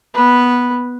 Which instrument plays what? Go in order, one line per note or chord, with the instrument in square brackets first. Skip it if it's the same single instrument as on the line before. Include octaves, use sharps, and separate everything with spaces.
[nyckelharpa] B3 B4